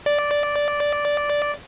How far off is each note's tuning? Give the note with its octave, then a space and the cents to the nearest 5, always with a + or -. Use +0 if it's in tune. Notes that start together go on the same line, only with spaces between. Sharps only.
D5 -5